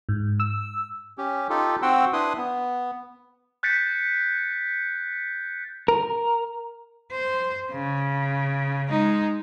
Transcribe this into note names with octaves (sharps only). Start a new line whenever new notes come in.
G#2
E6
C#4 G4
D#4 F4 G4 A4
C4 F#4 F#5 G5 C6 E6
D4 E4 B4 C6 D#6
B3
F#6 G6 A6 B6 C#7
A#4
C5
C#3
G#3 D#4